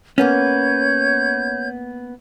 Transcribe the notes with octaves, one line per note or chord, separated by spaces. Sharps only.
A#3 B3 C#4 C#5 G6